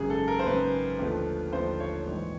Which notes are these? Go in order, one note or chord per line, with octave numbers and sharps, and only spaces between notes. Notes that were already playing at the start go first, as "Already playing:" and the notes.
Already playing: G#1 F#2 C#3 G#4
A4
A#4
C5
G#1 F#2 C#3 B4
D#2 D3 F3 A3
D#2 D3 F3 A3 C5
C#5
A#1 G#2 E3 G3